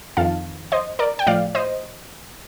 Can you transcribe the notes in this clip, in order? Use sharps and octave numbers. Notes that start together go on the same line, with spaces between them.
F2 D#3 F5 A5
C5 D#5
A#4 D5
G5
A2 F3 D5 F5
C5 D#5